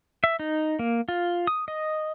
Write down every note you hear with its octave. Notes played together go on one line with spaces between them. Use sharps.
E5
D#4
A#3
F4
D#6
D#5